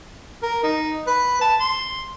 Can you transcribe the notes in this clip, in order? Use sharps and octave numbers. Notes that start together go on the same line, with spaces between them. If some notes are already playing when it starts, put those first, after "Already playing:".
A#4
D#4
B4
A5
C6